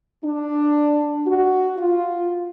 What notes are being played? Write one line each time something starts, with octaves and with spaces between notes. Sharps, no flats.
D4
F#4
F4